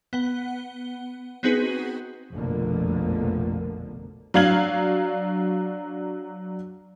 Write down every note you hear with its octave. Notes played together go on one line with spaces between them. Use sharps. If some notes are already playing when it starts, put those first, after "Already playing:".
B3 F#5 G7
B3 C4 D#4 F#4 G#4 B4
F1 A#1 B2 D3 F3 A#3
F#3 D4 F5 G#6 F#7